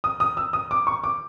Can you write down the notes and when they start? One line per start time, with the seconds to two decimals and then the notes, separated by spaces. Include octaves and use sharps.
0.04 D#6
0.20 D#6
0.37 E6
0.53 D#6
0.71 D6
0.87 C#6
1.04 D6